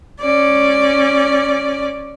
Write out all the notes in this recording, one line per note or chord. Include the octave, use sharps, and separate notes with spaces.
C#4 D5